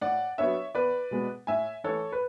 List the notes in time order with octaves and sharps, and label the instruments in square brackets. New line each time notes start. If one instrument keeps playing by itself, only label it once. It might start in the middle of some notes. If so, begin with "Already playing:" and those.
[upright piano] A2 D5 F#5
F#3 B3 D4 C#5 E5
E2 B4 D5
B2 G#3 B3
A2 E5 G#5
E3 A3 A4 C#5
B4